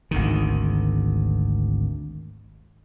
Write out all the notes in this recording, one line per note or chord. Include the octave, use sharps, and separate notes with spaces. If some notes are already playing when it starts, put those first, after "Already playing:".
G#1 D2 D#3